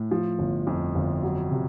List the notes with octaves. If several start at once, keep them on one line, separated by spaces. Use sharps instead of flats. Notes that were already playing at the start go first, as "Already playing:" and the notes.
Already playing: A2
F3
G1
F2
G1
F#3
C3